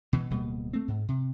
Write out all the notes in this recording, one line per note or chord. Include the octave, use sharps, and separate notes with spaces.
B2 E3
D1 B2 G3 A#3
A3 C4
G#2
C3